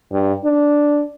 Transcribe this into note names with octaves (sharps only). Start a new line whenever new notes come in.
G2
D4